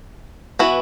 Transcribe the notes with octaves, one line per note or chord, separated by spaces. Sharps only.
E3 B3 E4 F#4 B4